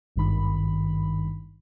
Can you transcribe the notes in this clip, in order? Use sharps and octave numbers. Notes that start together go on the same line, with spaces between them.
G#1 G2 D#3 B5